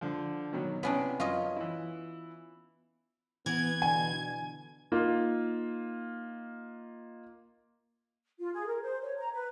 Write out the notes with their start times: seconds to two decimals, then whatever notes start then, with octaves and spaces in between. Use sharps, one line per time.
0.01 D3 F3
0.53 B2 D#3 F#3
0.83 C3 B3 C#4 D4 E4 F#6
1.20 F#2 F4 C#5 D#5
1.57 E3 E4
3.46 E3 B3 G#6
3.82 B2 D3 D4 G#5
4.92 A#3 D#4 F4
8.39 F4
8.53 G#4
8.66 A#4
8.82 C5
9.02 C#5
9.18 A#5
9.33 B4